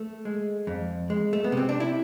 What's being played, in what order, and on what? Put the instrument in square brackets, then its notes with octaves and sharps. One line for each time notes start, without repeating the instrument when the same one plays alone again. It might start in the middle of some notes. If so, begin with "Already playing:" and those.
Already playing: [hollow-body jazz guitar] A3
G#3
F2
G#3
A3
B3
C3 C4
D4
E4